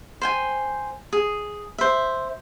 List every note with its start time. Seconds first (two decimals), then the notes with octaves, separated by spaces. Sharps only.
0.21 C5 G5 G#5
1.13 G#4
1.78 C5 E5